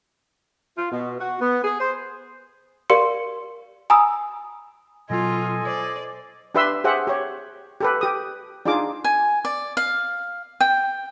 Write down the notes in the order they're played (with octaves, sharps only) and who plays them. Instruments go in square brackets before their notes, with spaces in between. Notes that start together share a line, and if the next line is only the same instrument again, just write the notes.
[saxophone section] F4
B2
F#4
B3
G#4
C5
[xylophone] G4 A#4 D5 F5 C6 C#7
G#5 A#5 B5 D#6 E6
[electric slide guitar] B2 F#3 [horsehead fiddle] F4 [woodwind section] A4 D#5 G#5
[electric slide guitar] C5 [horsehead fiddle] D5
[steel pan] D4 G4 B4 E5 C6 E6
G4 G#4 C5 E5 F#5
G4 C#5
G4 A4 B4
G4 D#6
D4 D#4 F4 G#4 D6
[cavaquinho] G#5
D5
F5
G5